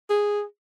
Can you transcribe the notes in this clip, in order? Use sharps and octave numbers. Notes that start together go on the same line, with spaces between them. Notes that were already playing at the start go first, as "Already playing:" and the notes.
G#4